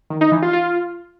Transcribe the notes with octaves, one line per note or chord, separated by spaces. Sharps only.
D#3
D#4
E3
F4
F4